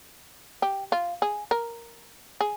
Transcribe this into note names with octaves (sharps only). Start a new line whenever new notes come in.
G4
F4
G#4
A#4
G#4